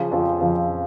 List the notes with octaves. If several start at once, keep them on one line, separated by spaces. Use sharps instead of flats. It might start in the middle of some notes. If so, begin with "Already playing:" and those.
Already playing: C#3 F3
F2 C#3 F3
F2 C#3 F3